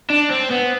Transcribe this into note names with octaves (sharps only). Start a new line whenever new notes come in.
D4
C4
B3